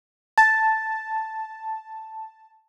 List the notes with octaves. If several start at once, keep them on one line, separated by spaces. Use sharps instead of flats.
A5 A6